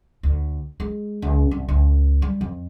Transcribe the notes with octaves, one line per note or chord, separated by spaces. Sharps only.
D2
G#3
C#2
C2
C#2
G3
F2